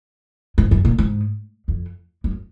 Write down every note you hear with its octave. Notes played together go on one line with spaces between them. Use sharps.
G#2
F#2
A#2
G#2
F2
F#2